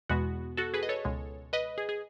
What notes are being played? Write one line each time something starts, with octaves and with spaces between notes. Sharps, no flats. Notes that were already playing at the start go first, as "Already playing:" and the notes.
E2 B2 G#3 B3 F#4
F#4 A4
G#4 B4
D#5
A4 C#5
C#2 B2 G#3
B4 D#5
G#4
G#4